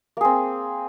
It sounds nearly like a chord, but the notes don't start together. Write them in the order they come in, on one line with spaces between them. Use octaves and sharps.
A#3 G#4 C4